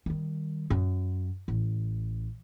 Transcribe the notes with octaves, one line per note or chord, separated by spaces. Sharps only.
D#3 G3
F#2
A1